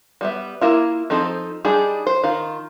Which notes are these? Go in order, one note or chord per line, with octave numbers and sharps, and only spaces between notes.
G3 B3 E5
A#3 E4 F4
F3 C4 D#4 A4
G3 D4 D#4 G#4
C5
D#3 F4